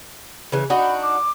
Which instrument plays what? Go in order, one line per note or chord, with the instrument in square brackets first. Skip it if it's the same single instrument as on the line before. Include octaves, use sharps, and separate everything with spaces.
[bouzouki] C#3 E3
[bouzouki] D4 D#4 F#4 [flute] B5
[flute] D6